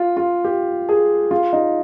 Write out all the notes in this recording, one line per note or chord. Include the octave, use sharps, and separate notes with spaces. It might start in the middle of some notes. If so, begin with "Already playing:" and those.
Already playing: F4
F4
G4
G#4
F4
D#4